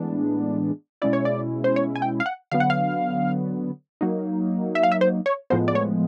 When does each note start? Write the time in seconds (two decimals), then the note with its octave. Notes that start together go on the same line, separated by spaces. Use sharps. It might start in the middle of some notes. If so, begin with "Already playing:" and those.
Already playing: A2 E3 G#3 B3 D4
1.02 B2 G#3 C#4 E4 D5
1.13 C#5
1.25 D5
1.64 C5
1.76 C#5
1.96 G#5
2.02 G5
2.20 F5
2.26 F#5
2.51 D3 F#3 B3 F5
2.60 F#5
2.70 F5
4.01 F#3 A#3 D#4
4.75 E5
4.83 F5
4.92 E5
5.01 C5
5.26 C#5
5.50 A2 F3 G#3 B3 C5
5.68 D5
5.75 C#5